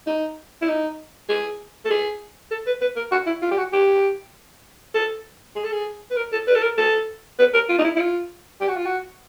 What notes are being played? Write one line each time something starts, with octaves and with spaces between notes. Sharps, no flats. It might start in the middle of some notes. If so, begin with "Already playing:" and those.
D#4
E4
D#4
G#4
A4
G#4
A4
B4
B4
A#4
F#4
E4
F4
G4
F#4
G4
A4
G#4
A4
G#4
B4
A#4
A4
B4
A4
A#4
A4
B4
A#4
F4
D#4
E4
E4
F4
G4
F#4
F4
F#4